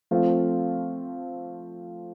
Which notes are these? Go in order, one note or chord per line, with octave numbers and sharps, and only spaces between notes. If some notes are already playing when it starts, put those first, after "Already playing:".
F3 A3 C4 F4